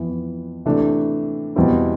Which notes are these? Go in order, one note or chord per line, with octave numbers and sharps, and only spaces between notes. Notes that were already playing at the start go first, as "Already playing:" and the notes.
Already playing: F2 E3 B3
C3 E3 A3 D4
E2 B2 G3 C4 E4